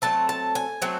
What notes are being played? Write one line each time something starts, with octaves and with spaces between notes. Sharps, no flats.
F#3 A3 C4 A5
A5
G#5
F#3 A3 C4